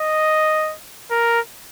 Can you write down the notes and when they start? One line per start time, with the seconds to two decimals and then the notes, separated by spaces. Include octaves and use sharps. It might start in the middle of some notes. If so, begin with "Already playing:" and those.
Already playing: D#5
1.11 A#4